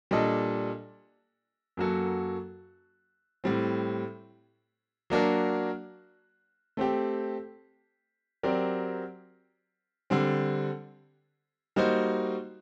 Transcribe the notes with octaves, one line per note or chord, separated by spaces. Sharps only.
A#2 G3 D4 A4 D#5
F#2 F#3 A#3 F#4 A4
A2 G3 C4
F#3 A#3 D4 F#4 A#4
A3 C4 G4
F#3 C4 G4 A#4 D5
D3 G3 C4
G3 A#3 D#4 F#4 C5